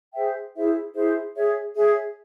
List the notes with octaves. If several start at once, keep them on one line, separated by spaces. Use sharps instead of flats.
G#4 C5 E5 G5
E4 G#4 C5 E5
E4 G#4 C5 E5
G#4 C#5 E5
G#4 C#5 E5